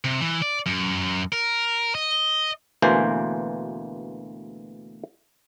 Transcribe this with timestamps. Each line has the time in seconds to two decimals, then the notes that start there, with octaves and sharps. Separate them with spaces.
0.04 C3
0.20 E3
0.42 D5
0.66 F#2
1.32 A#4
1.95 D#5
2.82 D2 B2 E3 A#3 C5 G#5